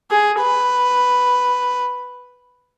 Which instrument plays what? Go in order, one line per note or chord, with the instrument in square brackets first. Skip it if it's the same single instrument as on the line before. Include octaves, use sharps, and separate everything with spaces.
[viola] G#4
B4